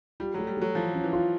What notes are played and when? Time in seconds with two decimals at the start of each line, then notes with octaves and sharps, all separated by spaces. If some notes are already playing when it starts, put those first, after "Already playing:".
0.20 G3 F4
0.34 F#3 A3
0.47 G3
0.57 F#3 A3
0.75 E3 F3
0.94 C#4
1.04 E3
1.13 F4